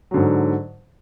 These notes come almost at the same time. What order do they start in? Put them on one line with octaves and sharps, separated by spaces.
F#3 D3 G#2